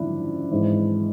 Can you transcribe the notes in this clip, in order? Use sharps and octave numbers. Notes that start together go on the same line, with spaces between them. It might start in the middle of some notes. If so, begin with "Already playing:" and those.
Already playing: G#1 F#2 D3 F3 D4 E4
G#1 G#2 E3